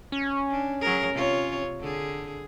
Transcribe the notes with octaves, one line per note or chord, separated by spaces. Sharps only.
C#4
D4
F#3 G#4 A#4
C3 F4 C#5
D3 G#4